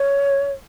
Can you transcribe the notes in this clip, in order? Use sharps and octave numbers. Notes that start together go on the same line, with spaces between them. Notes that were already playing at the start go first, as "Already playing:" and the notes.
Already playing: C#5